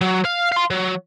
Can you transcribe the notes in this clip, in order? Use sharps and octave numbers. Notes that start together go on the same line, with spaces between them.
F#3
F5
F5 C6
F#3